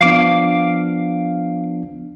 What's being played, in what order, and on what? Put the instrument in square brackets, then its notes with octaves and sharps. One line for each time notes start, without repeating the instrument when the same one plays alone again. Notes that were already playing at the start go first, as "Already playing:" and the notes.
[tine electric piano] F3 B3 D4 [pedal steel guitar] F5 D6